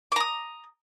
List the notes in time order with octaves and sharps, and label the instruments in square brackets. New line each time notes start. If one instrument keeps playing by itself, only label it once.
[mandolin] D6
A#5
D#6